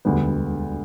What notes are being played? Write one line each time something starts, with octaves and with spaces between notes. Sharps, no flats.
E1 D2 D3 G3 B3